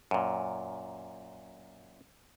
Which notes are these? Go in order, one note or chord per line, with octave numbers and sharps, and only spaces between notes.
F#2 A#2